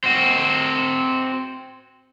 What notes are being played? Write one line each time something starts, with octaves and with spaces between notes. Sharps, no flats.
C4 F#4